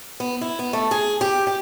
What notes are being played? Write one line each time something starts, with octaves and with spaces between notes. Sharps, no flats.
B3
E4
B3
A3
G#4
G4
G4